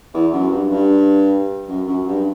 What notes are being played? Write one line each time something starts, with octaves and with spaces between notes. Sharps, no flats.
E2
F#2
G2
G2
F#2
F#2
G2